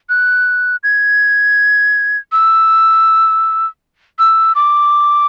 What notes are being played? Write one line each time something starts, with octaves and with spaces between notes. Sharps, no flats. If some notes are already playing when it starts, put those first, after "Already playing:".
F#6
G#6
E6
E6
D6